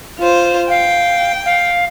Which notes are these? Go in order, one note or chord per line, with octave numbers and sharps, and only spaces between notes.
F4 C5
F5 G5
F5